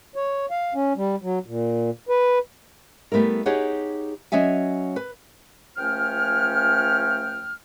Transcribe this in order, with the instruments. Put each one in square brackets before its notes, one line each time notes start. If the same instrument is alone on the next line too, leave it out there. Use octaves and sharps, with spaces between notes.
[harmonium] C#5
F5
C#4
G3
F#3
A#2
B4
[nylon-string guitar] G3 A3 B3 E4 A#4
D#4 G4 G#4 C#5 F#5
F#3 C#4 D#5 E5 G#5
B4
[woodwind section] C#2 F3 A3 C#4 G5 F6